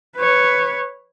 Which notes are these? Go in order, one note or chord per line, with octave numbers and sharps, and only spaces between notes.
B4 C#5